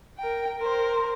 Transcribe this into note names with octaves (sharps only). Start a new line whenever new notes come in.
A#4 G5
A#4 C5